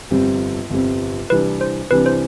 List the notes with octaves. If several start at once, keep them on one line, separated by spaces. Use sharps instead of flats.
G1 F2 C3 G3 C4
G1 F2 C3 G3 C4
C2 C3 E3 G3 D4 B4
C5
C2 C3 E3 G3 D4 B4
C5